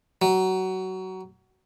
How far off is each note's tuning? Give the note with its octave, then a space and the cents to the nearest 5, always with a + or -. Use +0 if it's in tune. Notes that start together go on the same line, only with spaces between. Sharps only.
F#3 +20